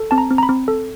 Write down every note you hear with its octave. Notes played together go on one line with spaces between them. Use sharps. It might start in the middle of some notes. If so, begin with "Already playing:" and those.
Already playing: A4
C4 A5
A#5
C4
A#5
B5
C4
A4